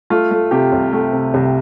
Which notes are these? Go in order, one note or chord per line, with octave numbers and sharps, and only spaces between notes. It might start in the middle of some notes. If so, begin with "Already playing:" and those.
A3 F4
A3
C3 G4
C2
A3
C3
C2